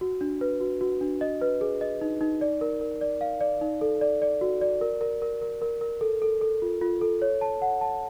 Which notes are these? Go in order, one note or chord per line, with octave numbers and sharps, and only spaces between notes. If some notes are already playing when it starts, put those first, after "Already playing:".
F#4
D4
B4
F#4
F#4
D4
D#5
B4
G#4
D#5
D#4
D#4
D5
A#4
A#4
D5
F5
D5
D#4
A4
D5
D5
F#4
D5
A#4
A#4
A#4
A#4
A#4
A#4
A4
A4
A4
F4
F4
A4
C#5
A5
F#5
A5